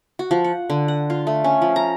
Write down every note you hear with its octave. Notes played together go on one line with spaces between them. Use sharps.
F#4
F3
F#5
D3
F#5
F4
A3
C#4
F3
A#5